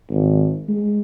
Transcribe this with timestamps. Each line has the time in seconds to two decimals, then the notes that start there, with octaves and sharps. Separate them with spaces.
0.10 G#1
0.69 G#3